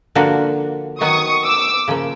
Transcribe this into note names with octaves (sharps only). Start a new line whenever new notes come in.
D3 F3 A#3 D4 F#4
D#3 F#3 B3 C#6 D#6
D6 E6
C#3 F3 A#3